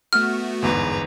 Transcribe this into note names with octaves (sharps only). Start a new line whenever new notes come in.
A3 B3 F#4 F6
G1 E2 G#2 B4 A#5